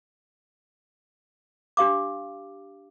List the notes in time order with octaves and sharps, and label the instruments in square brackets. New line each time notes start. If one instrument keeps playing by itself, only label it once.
[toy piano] D4 G4 F5 D6